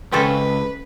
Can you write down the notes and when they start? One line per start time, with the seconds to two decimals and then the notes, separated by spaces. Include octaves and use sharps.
0.12 C#2 C4 C#4 A4 B4